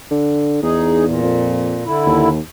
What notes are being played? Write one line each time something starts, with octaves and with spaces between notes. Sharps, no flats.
D3
E2 D#4 G#4
A#2
F2
D3 E4
D#2